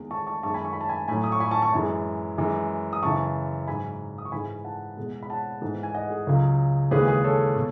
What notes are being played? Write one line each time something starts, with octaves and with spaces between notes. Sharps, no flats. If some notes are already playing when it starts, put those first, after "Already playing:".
Already playing: E2 D#3 G#3
A5 C#6
A5 C#6
F#2 D#3 G#3 A5 C#6
G#5 B5
C#6
B5
A5
G#5 B5
A2 F#3 G#5 B5
D#6
C#6
G#5 B5
A5 C#6
A5 C#6
F#2 E3 G#3
F#2 E3 G#3
D#6
F#2 C#3 E3 A5 C#6
G#2 F#3 G#5 B5
D#6
C#6
G#2 E3 G#3 G#5 B5
F#5 A5
E2 B2 G#3
B5
F#5 A5
G#2 E3 G#3
G#5
D#5 F#5
G#4
C#2 C#3 F#3
D#2 C#3 E3 G#3 G#4 B4
G#4
A4 C#5
B2